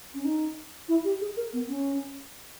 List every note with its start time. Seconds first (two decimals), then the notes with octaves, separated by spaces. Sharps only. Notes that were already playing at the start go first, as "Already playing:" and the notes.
0.14 C#4
0.25 D#4
0.89 E4
1.05 G4
1.21 G#4
1.37 A#4
1.53 B3
1.69 C#4